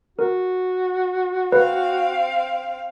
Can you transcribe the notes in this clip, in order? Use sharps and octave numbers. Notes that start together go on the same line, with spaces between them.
F#4 A#4
C4 B4 F5